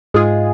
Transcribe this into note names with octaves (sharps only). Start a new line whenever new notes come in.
G#2 G#3 F4 G#4